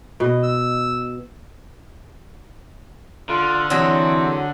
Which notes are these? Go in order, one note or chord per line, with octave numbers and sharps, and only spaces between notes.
B2 D#5
E6
D3 F4
E3 F#3 A3 C4 G#4